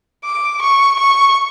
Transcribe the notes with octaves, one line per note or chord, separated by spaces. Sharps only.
D6
C#6
C#6